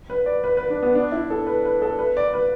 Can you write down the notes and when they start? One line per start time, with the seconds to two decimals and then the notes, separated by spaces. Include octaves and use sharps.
0.10 B4
0.26 D5
0.44 B4
0.57 B4
0.70 D4
0.82 B3
0.95 D4
1.12 E4
1.30 A4
1.47 B4
1.65 B4
1.82 A4
1.99 B4
2.17 D5
2.34 B4